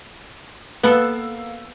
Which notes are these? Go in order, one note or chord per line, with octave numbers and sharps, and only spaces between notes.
A#3 B3 A4 E6